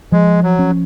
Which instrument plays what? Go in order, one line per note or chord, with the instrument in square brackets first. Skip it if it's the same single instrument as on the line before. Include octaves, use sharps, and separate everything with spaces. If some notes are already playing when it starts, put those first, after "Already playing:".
[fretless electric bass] F3 [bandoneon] G#3
[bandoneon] F#3
[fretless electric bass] C#4